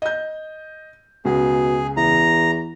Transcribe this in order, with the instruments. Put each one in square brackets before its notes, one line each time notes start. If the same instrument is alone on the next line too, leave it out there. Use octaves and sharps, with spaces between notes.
[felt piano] D#5 G6
[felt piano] C#2 [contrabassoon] B2 [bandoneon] G#4
[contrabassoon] E2 [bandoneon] A#5